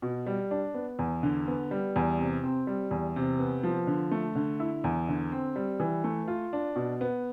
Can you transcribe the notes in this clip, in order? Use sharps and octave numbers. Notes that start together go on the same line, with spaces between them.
B2
G3
D4
B3
E2
D3
B3
G3
E2
C3
C4
G3
E2
C3
B3
F3
D3
A3
D3
E4
E2
D3
C4
G3
E3
A3
F4
D4
B2
B3